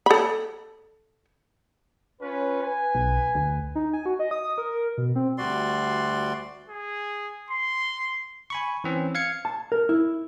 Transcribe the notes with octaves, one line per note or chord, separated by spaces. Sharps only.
A4 B5
C#4 F4 B4
B4 G#5
B1
D2
D#4
G#5
F#4
D#5
D#6
A#4
B2
C4
D2 G3 F#4 D5 C6
G#4
C6
G#5 B5 C#6
E3 C4 C#4
F5 G#6 C#7
A5
A#4
E4